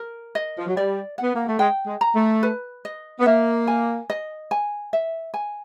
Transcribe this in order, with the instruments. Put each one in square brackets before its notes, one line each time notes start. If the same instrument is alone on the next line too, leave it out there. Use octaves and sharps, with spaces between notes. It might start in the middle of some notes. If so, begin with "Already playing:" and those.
Already playing: [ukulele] A#4
D#5
[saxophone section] F3
F#3
[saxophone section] G3 [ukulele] D5
[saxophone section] B3 [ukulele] F#5
[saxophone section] A#3
A3
[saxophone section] G#3 [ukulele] G5
[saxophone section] G#3
[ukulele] A#5
[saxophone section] A3
[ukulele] B4
D#5
[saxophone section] B3
[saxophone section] A#3 [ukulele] E5
[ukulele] G#5
D#5
G#5
E5
G#5